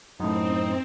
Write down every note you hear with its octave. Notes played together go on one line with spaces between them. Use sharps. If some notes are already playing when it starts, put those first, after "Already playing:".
F#2 A2 C4 D#4